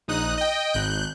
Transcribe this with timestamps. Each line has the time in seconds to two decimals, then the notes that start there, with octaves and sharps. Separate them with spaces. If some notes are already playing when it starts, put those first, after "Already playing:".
0.08 A#1 D#4 D#6 F#6
0.38 D#5 G5
0.73 G#1 F#6 G6